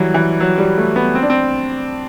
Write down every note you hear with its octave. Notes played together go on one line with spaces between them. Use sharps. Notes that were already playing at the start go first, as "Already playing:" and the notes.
Already playing: E3 F#3 G3
E3
F#3
G3
A3
B3
C4
D4
C4